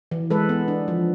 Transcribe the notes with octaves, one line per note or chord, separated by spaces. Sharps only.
E3
G#3 A4 B4
B3
D4
F3